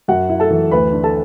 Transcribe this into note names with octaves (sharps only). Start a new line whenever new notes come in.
F#2 F#4 F#5
E4
A4 A5
E3
D2 B4 B5
D4
A4 A5